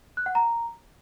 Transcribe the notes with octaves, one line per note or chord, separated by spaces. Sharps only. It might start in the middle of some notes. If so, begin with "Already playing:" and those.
F#6
F#5
A#5